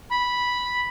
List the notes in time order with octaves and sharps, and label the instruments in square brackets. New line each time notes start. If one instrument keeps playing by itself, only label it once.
[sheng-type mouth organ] B5